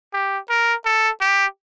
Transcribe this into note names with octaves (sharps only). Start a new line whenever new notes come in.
G4
A#4
A4
G4